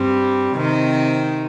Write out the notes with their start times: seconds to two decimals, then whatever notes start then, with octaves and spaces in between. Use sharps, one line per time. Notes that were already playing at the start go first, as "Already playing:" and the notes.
Already playing: G2 G3 C4
0.56 C3 D#3 C4 D#4